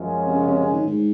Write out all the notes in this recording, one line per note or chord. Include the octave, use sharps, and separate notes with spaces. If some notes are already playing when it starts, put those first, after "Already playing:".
Already playing: F#2 F3 G#3 C#4
C3
C#3
C3
C#3
D#3
G#2